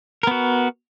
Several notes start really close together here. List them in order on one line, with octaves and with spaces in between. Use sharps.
A#4 B3 F#4